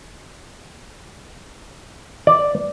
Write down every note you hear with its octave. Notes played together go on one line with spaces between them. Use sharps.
D5